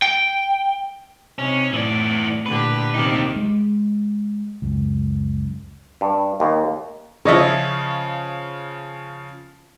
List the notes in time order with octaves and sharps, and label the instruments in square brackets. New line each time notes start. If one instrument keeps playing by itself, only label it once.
[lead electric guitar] G5
[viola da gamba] C3 D#4 [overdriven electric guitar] C#4
[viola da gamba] A2 [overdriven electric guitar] E3 D5
[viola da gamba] A#2 D3 G4 [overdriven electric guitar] B4
[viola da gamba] C3 D#3 G4 [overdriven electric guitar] A#3 D#4
[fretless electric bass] G#3
C#2 F#2
[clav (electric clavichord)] G2
D#2
[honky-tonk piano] C#3 F3 [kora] C#5 D#5 E5